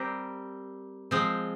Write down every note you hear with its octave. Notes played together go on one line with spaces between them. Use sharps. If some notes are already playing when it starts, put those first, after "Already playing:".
Already playing: G3 C4 G4 A#4
F3 G#3 C4